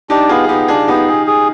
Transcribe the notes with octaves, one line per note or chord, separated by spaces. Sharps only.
D4 D#4 G4
B3 F4 G#4
G#4
B3 D#4 G4
D4 F4 G#4
B3 D#4 G4
G#4
G#4